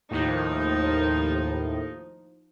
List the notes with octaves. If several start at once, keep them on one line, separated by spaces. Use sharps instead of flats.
D#2 A2 F3 D#4